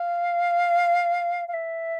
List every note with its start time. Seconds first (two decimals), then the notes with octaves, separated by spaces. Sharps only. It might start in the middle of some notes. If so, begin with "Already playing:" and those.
Already playing: F5
1.48 F5
1.53 E5